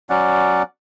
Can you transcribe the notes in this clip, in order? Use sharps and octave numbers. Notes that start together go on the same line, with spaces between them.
F#3 C#4 D5 F#5